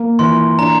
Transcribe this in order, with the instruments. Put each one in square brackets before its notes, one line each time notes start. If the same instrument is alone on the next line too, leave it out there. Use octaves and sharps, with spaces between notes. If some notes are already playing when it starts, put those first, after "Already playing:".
Already playing: [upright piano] A#3
[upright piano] E3 [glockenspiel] C6
[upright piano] D4 [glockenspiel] A#5